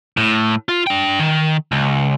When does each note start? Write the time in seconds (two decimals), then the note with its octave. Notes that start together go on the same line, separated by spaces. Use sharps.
0.17 A2
0.69 F4
0.87 D4 G5
1.19 D#3
1.72 C#2